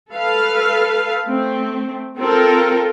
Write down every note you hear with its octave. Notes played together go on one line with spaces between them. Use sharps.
A4 B4 F5
A3 C4
C4 F4 A4 A#4